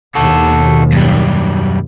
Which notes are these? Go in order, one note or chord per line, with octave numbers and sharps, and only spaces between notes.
D#2 B2 F#4 A4
F#2 G3